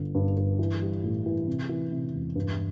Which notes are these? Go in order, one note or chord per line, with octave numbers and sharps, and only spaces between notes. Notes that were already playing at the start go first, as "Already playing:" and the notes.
Already playing: G1 D3
G2
G2
E3
G3
A2
E3
C3
E3
C3
E1
G2